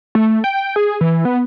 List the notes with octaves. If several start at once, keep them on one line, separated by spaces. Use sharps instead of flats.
A3
G5
G#4
E3
B3